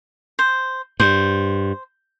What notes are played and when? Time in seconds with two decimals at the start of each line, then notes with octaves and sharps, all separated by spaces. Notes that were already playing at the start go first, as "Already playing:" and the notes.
0.39 C5
1.00 G2 C5